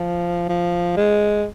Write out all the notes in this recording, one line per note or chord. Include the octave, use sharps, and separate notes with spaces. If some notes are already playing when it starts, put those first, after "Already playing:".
Already playing: F3
F3
G#3